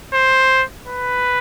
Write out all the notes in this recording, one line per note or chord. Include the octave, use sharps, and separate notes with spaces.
C5
B4